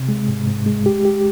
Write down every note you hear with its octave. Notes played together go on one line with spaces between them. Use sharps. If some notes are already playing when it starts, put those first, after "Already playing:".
Already playing: C3
G#3
G#2
G#2
G#3
G4
G4